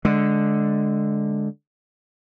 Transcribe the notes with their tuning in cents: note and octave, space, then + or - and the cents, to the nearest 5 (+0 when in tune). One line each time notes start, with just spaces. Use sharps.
D3 +0 G#3 +5